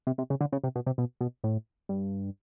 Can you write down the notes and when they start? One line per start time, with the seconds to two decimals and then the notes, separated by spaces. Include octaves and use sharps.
0.07 C3
0.18 C3
0.30 C#3
0.41 D3
0.52 C#3
0.64 C3
0.75 B2
0.86 C3
0.98 B2
1.21 B2
1.44 A2
1.89 G2